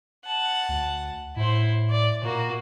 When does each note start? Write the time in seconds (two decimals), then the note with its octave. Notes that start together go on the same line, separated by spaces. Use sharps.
0.25 F#5 A5
0.69 D2
1.36 A2 E4 C5
1.90 D5
2.22 A#2 A#3 F#4